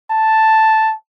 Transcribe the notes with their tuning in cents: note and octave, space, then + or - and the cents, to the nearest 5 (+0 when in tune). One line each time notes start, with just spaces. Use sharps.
A5 +0